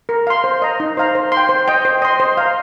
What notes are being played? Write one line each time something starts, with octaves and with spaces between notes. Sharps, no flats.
A#4
F5 C6
C5
D#5 A#5
D#4
C5 F5 A#5
C5
C6
G5
C5
D#5 G5
C5
D#5 C6
C5
F5 A#5